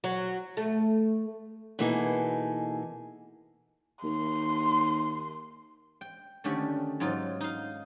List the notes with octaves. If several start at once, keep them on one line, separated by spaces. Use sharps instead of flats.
F#3
A3
B2 E3 A#3 D#4 G#4 A4
D#2 C6
G5
D3 D#3 A3 C#4 G4 D5
G#2 F#3 D#4 F4
D#4 F5